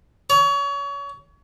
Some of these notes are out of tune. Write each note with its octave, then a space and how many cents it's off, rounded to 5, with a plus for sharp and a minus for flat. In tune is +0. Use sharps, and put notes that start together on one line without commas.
C#5 +30